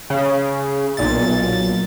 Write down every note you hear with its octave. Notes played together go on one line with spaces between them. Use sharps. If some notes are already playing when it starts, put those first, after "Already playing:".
C#3
B1 A#2 A6